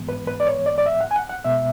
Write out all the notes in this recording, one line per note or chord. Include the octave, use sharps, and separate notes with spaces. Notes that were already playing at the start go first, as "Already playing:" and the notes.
Already playing: G#2 E3 G#3 B3
B4
B4
D5
C#5
D5
D5
E5
F#5
G#5
F#5
F#5
B2 G#3 B3 E5